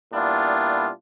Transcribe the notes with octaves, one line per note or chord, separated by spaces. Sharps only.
A#2 G3 B3 D4 E4 F4